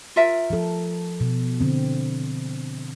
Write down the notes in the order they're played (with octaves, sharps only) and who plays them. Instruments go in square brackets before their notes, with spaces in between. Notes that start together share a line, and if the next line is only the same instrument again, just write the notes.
[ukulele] F4 A#4 E5
[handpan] F3 A4
B2
D3 C4